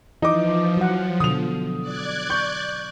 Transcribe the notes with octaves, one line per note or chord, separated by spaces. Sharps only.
E3 F3 D#4 D6
F#3 F#5
B2 D3 D#6 F7
D5 F#6 G#6
C#6 G6